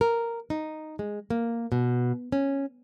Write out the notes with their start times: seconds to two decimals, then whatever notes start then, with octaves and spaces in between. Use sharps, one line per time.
0.01 A#4
0.50 D#4
0.99 G#3
1.30 A#3
1.72 B2
2.32 C#4